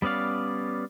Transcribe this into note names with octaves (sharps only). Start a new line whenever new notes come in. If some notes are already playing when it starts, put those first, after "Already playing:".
G3 B3 C#4 D5 F5